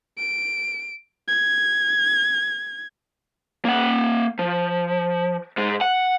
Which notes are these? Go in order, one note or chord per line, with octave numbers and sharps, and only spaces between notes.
D7
G#6
A#3 F#5
F3
G#2 G#3
F#5